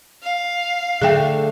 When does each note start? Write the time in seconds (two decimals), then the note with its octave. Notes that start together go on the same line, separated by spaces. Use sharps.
0.23 F5
1.01 D3 A3 G#4 G5